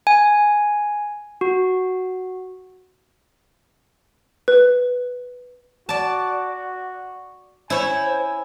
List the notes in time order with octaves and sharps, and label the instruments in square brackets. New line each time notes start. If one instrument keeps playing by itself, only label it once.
[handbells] G#5
F#4
[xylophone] B4
[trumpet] F#4 [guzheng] D5 A5
[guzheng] E4 C#5 [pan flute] C5 [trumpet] G#5